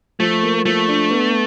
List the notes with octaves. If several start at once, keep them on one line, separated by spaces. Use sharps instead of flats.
F3 A3
A#3
F3 A3
D4
B3